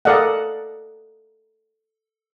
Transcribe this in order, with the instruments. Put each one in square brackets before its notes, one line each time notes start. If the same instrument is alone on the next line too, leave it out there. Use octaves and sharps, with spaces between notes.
[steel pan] A4 A#4 D5 D#5 F5 F#5